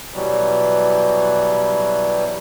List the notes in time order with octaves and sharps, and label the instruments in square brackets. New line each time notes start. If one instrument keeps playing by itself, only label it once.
[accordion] B2 E3 F#3 G3